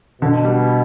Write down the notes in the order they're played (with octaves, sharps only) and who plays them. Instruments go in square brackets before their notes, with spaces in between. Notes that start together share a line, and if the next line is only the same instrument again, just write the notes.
[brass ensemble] B2 [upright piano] D3
[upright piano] G3